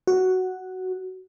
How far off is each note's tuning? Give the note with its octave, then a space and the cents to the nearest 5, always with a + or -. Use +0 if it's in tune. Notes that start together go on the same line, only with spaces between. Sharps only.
F#4 +5